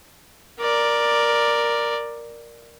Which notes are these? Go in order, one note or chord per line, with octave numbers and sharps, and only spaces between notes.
A#4 D5